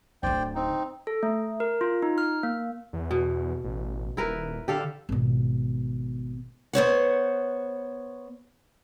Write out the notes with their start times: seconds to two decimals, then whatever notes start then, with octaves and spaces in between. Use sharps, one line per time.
0.23 D1 D3 C5 D5 G5
0.55 C4 D#4
1.07 A4
1.23 A3
1.60 A#4
1.81 F4
2.02 D#4
2.18 F6
2.43 A#3
2.93 E2
3.11 B2
3.64 A1
4.17 D#1 E4 A#4 B4
4.68 D3 G4 A4 F5
5.09 G#1 B2
6.73 B3 C5 C#5 F#5